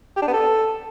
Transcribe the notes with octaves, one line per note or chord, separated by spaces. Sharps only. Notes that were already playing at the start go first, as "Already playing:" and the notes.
G4
D4
B3
A4